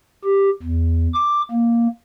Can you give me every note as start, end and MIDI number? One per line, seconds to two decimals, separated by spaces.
0.25 0.50 67
0.63 1.07 40
1.14 1.41 86
1.51 1.87 58